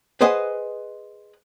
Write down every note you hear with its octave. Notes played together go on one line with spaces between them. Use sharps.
G#4 B4 C5 D#5 F#5 G#5